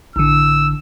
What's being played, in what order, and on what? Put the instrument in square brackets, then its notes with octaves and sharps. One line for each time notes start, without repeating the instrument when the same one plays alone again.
[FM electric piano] A1 D3 [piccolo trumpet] E6